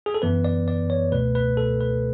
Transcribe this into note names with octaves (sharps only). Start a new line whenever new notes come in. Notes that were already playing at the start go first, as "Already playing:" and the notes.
G#4
A4
F#2 E3 B3 B4
D5
D5
C#5
C#2 B2 A3 B4
B4
A4
B4